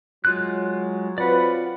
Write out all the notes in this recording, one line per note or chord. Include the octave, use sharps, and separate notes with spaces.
F#3 G#3 F4 F#6
C4 F4 F#4 B4 D5 F#5